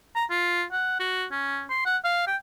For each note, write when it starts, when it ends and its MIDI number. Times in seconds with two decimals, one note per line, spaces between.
0.15 0.25 82
0.30 0.64 65
0.72 0.96 78
1.00 1.26 66
1.31 1.65 61
1.70 1.84 84
1.86 1.97 78
2.04 2.26 77
2.27 2.36 79